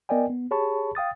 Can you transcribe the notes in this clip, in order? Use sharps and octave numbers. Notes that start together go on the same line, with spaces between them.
B3 A#4 D5 D#5 G5 G#5
B3
G4 G#4 C#5 A5 B5 C#6
F5 G5 D#6 A6